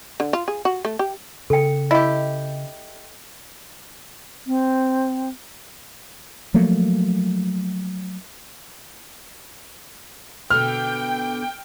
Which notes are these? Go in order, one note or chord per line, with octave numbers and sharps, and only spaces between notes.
D3
F4
G#4
F#4
A3
G4
C#3 A4 G5
E4 G4 D#5
C4
F3 F#3 A3 A#3
B2 D3 G5 F6